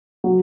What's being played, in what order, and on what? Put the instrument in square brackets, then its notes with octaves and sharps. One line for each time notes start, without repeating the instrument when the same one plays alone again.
[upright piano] F#3